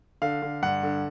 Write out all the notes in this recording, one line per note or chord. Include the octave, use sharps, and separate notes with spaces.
D3 F5
D3
G2 F#5
D3